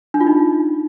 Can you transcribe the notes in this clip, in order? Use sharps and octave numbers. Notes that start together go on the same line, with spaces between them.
D4
F4
D#4